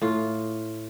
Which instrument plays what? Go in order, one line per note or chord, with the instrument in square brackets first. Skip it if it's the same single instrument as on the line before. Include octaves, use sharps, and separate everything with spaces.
[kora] A2 F4